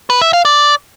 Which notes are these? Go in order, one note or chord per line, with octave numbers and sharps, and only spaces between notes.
B4
E5
F5
D5